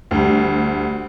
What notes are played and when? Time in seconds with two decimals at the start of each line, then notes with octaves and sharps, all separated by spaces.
0.11 D2 G3